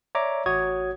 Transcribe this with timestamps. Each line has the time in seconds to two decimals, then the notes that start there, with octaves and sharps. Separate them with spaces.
0.15 C#5 D5 E5 A#5 D6
0.46 A1 F#4 C#5 D#6 G#6